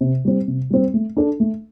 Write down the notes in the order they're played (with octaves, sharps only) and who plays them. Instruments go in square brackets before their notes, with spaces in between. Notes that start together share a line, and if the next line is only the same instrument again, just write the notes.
[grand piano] C3
G3 C4
C3
G3 C4
A3
D4 A4
A3